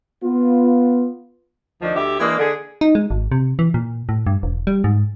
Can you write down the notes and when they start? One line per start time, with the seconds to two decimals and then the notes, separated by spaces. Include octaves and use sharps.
0.24 B3 F4
1.81 D2 D#3 F3 D4
1.94 D2 G4 E5
2.20 E3 G#3 A#3 D4
2.38 D3 G#4
2.81 D#4
2.95 G#3
3.11 G#1
3.32 C3
3.59 E3
3.74 A#2
4.09 A2
4.27 G2
4.43 E1
4.67 G3
4.84 G#2